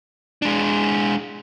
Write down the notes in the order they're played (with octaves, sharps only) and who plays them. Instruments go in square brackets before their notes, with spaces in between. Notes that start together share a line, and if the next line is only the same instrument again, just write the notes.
[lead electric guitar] G#3 D4